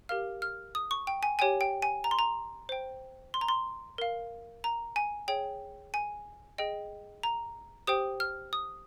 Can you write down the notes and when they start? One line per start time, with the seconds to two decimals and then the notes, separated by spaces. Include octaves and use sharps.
0.09 G4 A#4 F5 F6
0.42 F6
0.75 D#6
0.91 C#6
1.07 G5
1.23 G#5
1.39 G4 C#5 G5 G#5
1.61 G5
1.82 G#5
2.04 A#5
2.11 C6
2.19 A#5
2.69 C5 G5
3.34 C6
3.41 A#5
3.48 C6
3.98 A#4 F5
4.64 A#5
4.96 G#5
5.28 G#4 C#5 G5
5.94 G#5
6.58 G#4 D#5 G5
7.23 A#5
7.87 G4 C5 G5 D#6
8.20 F6
8.53 D#6